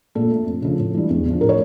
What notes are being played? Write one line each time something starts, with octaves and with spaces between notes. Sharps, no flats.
A#2 A4
A3
F2
C#3 F3
A2
E3 G3
E2
D3
F3
A2 A#4
C#5